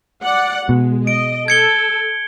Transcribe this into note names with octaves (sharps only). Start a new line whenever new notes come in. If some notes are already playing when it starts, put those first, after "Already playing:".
D5 F#5
B2 G#3
D#5 D7
A4 G#6 C#7 G7